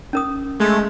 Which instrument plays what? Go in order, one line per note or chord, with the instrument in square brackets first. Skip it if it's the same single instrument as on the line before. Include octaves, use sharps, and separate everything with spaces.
[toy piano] C#4 A#4 D#6
[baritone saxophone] G#3 [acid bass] A3